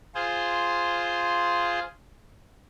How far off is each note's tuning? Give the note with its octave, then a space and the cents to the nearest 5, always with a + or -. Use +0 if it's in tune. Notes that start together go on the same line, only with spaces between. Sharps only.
F4 -5 G#4 +0 C5 +0